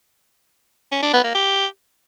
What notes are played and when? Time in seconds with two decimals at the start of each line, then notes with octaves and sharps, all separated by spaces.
0.92 C#4
1.03 D4
1.13 B3
1.24 A#3
1.35 G4